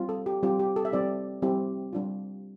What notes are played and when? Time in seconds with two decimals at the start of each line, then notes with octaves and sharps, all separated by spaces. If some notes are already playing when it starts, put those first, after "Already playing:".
Already playing: G3 C4 F4
0.09 A4
0.26 G4
0.43 G3 C4 F4 G4
0.59 G4
0.76 A4
0.85 E5
0.92 G3 C4 E4 G4 D5
1.42 G3 C4 E4 G4
1.93 G3 D4 F4